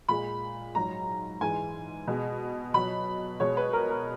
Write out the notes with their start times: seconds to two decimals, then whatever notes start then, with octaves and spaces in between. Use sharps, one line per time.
0.08 A#2 G#3 B5
0.75 G#2 F#3 A#5
1.41 G#2 E3 G#3 G#5
2.07 B2 G#3
2.74 B2 F#3 B5
3.40 B2 G#3 C#5
3.57 B4
3.73 A#4
3.90 A#4